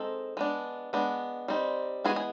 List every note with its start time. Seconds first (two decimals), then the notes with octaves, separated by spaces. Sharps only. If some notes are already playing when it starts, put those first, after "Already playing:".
Already playing: G#3 C4 D#4 A4
0.37 G#3 B3 D4
0.93 G#3 B3 D4
1.48 G3 C4 D#4
2.04 E3 G#3 B3 F#4 G#4
2.16 G#4